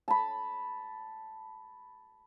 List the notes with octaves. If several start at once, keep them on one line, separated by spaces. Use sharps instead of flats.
A5 B5